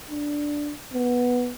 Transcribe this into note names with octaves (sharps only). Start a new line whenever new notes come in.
D4
B3